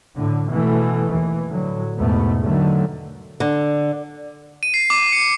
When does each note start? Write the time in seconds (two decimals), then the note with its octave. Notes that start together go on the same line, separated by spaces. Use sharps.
0.17 A2 D3
0.50 B2 E3 A3 B3
1.11 D#2 E3
1.49 A2 D3 F#3
1.95 E2 G#2 B2 A3 B3
2.43 D3 D#3 F#3 A3
3.40 D3
4.63 D#7
4.74 C7
4.90 D6
5.12 C#7